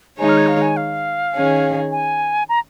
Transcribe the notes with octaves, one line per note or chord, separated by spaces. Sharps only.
D#3 G#3 D#4 C#5 G#5
F6
G#6
F5
G#5
F5
D#3 C#4 G#4
G#5
A#5